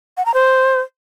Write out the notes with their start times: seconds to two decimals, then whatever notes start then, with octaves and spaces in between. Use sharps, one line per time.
0.17 F#5
0.26 A#5
0.34 C5